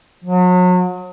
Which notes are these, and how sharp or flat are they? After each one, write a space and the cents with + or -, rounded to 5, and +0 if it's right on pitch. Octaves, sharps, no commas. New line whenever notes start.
F#3 -35